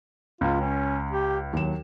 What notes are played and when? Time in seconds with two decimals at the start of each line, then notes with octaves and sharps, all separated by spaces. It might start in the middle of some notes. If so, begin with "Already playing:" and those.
0.41 C#2 F4
0.60 C#4
1.11 G4
1.53 D#2 F#3 E7